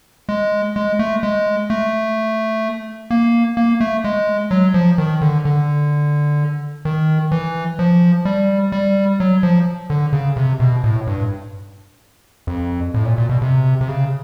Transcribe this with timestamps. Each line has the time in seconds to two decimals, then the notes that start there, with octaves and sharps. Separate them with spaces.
0.29 G#3
0.76 G#3
0.99 A3
1.23 G#3
1.70 A3
3.11 A#3
3.57 A#3
3.81 A3
4.04 G#3
4.51 F#3
4.74 F3
4.98 D#3
5.21 D3
5.45 D3
6.85 D#3
7.32 E3
7.79 F3
8.25 G3
8.72 G3
9.20 F#3
9.43 F3
9.90 D3
10.13 C#3
10.37 C3
10.60 B2
10.84 A2
11.07 G2
12.47 F2
12.94 A2
13.05 A#2
13.18 A#2
13.29 B2
13.42 C3
13.81 C3
13.88 C#3